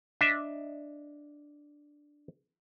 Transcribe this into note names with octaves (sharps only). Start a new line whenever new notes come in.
D4 D#5 E5